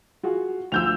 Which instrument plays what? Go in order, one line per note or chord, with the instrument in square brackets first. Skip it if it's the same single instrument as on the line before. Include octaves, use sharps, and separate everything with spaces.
[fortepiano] F4 F#4 G#4
[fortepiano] D2 F3 [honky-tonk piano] E6 G6 F7